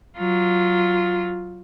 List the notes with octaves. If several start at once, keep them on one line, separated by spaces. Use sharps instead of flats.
F#3 F4